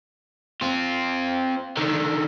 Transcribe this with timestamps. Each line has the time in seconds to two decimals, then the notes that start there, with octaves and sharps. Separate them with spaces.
0.61 C4 F4
1.77 D3 D#3